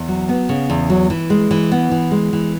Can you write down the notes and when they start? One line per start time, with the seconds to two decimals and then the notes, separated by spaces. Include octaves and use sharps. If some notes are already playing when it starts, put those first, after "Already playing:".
Already playing: E2
0.08 F#3
0.29 B3
0.49 C#3
0.70 E2
0.90 F#3
1.10 E3
1.30 G#3
1.51 E3
1.72 B3
1.91 E3
2.11 G#3
2.33 E3